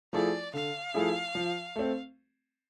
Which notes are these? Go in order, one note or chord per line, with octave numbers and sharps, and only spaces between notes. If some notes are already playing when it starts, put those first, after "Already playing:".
F3 A3 E4 G#4 D5
D3 F5
F3 A3 E4 G#4
F3
A3 C4